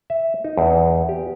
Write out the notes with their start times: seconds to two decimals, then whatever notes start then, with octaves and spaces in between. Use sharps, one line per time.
0.10 E5
0.44 D#4
0.57 E2
1.09 G4